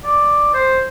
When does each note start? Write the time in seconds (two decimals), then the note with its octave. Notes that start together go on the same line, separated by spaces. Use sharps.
0.04 D5
0.54 C5